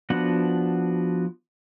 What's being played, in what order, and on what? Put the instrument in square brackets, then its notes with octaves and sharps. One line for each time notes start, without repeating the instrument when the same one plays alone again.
[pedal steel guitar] F3 B3 D4 F#4 F#5